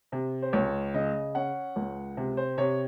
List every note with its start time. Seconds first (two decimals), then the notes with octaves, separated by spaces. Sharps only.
0.12 C3
0.42 C5
0.53 C#2 C#5
0.94 C#3 D#5
1.35 C#4 F#5
1.76 C#2
2.17 C3
2.37 C5
2.58 C3 C#5